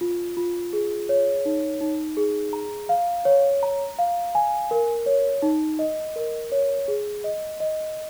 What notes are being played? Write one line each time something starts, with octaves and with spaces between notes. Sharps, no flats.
F4
F4
G#4
C#5
D#4
D#4
G#4
A#5
F5
C#5
A#5
F5
G#5
A#4
C#5
D#4
D#5
A#4
C#5
G#4
D#5
D#5